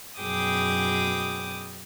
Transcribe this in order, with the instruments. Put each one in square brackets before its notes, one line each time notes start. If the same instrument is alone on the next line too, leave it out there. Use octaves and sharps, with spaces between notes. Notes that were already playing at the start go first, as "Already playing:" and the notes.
[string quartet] F#2 B2 G#4 G5 D6 D#6